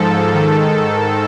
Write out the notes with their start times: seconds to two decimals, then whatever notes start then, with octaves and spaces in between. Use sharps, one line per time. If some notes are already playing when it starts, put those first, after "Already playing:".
Already playing: G#2 F3 A4
0.34 G#2 D#3